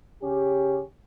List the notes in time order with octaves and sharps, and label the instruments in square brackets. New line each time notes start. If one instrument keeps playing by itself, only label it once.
[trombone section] C#3 C#4 G4